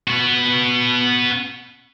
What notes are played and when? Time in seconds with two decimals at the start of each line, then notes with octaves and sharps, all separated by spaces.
0.08 B3 F#4